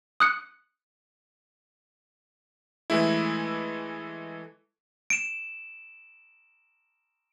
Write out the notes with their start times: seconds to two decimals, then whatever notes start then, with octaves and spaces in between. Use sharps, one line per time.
0.20 D#6 F#6 C#7
2.90 E3 G#3 A3 E4
5.10 D7 E7